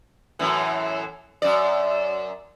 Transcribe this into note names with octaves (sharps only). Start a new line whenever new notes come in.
F#2 A2 E3
F#2 D5